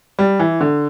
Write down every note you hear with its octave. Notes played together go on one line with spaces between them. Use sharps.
G3
E3
D3